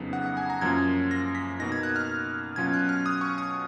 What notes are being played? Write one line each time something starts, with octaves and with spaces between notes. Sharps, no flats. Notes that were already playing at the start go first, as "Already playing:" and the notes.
Already playing: F2 C#3 F#3 B3 D#4
F#5
F#5
G#5
A#5
F#2 F3 A#3 C#4 F4 G#6
A#6
B6
B2 A#3 D#4 A#6
G#6
F#6
F6
B2 F#3 C#4 F4 G#6
F#6
F6
D#6
C#6
D#6